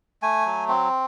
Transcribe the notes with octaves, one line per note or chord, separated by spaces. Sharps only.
A3 G#5
F#3
C4